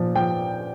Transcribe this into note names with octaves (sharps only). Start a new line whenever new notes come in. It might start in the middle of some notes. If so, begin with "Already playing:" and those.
Already playing: A#2 F3
F3 G5